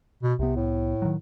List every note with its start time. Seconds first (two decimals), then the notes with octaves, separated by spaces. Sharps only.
0.23 B2
0.39 C2 C3 B3
0.56 A2
1.02 D#3 F#3